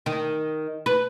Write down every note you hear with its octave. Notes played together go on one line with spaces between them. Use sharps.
D#3
B4